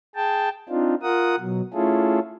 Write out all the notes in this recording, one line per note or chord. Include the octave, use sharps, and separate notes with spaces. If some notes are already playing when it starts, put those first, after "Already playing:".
G#4 G5 A5
C4 D4 D#4 F4
F4 A#4 F#5 D#6
B2 F#3
A3 C#4 E4 F4 G#4 A4